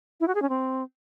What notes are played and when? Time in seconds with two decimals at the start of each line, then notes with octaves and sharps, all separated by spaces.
0.20 E4
0.28 F#4
0.35 G#4
0.42 C#4
0.49 C4